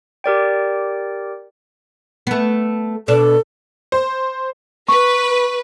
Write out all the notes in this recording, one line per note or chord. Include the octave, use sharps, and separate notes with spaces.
G4 A#4 D5 G5
A3 B3
B2 D4 A4
C5
B4 C#6